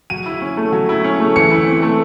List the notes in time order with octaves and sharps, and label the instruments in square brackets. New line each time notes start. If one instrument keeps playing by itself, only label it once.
[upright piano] F#3 D#7
E4
C#4
A3
F#3
E4
C#4
A3
E3 C#7
E4
C4
A3